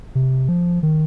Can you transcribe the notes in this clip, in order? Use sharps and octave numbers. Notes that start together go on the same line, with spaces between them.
C3
F3
D#3